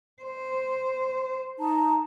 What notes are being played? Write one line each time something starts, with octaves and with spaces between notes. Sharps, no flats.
C5
D#4 A5 A#5